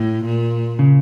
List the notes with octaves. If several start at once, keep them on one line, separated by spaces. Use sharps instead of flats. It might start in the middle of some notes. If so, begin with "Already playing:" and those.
Already playing: A2
A#2
C#3